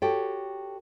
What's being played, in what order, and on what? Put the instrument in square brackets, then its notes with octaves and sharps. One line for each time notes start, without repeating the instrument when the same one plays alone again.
[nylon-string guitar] F#4 G4 A4 C#5 G5